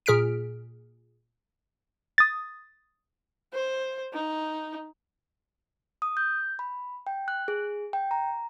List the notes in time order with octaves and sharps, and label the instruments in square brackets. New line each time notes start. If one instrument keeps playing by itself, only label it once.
[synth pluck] A#2 G#4 F6 B6 D7
D#6 A6
[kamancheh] C5
D#4
[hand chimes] D#6
G6
B5
G5
F#6
G#4
G5
A#5